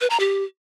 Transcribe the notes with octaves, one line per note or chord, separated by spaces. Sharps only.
B4
A#5
G4